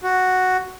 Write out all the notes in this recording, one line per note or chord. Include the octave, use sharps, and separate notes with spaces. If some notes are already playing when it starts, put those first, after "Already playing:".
F#4